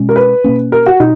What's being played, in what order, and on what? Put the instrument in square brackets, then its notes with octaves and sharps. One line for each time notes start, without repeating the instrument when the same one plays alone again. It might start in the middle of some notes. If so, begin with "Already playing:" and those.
Already playing: [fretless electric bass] B2 G#3 C#4
[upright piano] A#4
B4
[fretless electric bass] B2 A#3 C#4
[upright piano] A#4
F#4
[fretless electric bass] B2 [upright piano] D#4